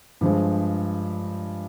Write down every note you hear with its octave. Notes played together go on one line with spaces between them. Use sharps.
G2 F3 G#3